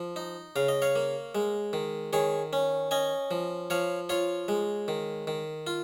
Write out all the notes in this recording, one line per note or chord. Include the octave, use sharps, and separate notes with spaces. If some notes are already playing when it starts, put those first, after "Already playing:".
Already playing: F3
D#4
C#3 F5
D#5
C#5 F5
A#3
G#3
D#3
D#3 G#4 C#5
C#4
C#4 D#5 G#5
F3
F3 C#5 F5
F4 C#5 F5
G#3
D#3
D#3
F4